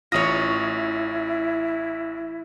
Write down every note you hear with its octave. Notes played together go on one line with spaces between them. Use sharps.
A1 E4 F4 C#5 D#6 A#6